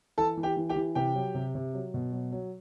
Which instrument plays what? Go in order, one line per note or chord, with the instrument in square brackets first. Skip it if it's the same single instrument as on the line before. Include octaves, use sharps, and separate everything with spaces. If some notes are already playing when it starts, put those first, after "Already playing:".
[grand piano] E3 A4 A5
E3
G4 G5
E3
G4 G5
E3
C3 G4 G5
F#3
C3
C3
F#3
B2
F#3
F#3